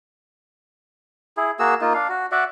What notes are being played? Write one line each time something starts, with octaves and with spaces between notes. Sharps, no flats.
E4 G#4
A#3 F#4 G#4 E6
A#3 D#4 F4
D4 F5
F#4
F#4 D5 E5 F#5